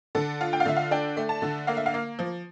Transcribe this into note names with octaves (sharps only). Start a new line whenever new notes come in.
D3 A4
F4
G5
F5
D3 E5
F5
D4 G5
A3
A5
D3
A#3 F5
E5
F5
A#3
F3